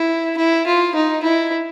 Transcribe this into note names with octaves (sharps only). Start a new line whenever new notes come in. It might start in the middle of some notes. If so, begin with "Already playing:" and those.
Already playing: E4
E4
F4
D#4
E4